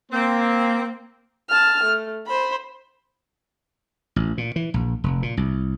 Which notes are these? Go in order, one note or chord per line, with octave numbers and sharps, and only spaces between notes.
A#3 C4
A5 F6
A3
C5 B5
A1
A#2
E3
A#1
F1
A#2
C2